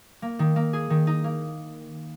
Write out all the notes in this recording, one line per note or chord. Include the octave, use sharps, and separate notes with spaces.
A#3
D#3
A#3
G#4
D#3
D#4
A#3